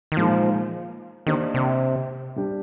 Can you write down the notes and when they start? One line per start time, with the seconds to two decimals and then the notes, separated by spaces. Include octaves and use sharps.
0.12 D#3
0.17 A#2 F3 G#3 D#4 A#4
1.27 D#3 A#3 D4 G4 C5 D#5
1.54 C3
2.36 G3 D4 G4